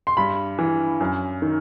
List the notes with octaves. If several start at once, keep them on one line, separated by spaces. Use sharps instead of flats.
C6
G2 B5
E3
F#2
D#3